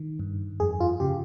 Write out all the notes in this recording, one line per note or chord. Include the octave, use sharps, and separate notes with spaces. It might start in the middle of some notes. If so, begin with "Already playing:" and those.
Already playing: D#3
G2
F2 G#4
F4
C#3 G4